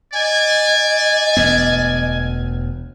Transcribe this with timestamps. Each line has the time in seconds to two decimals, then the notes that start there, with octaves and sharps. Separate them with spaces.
0.13 D5 D#5 G#5
1.37 E1 D2 B3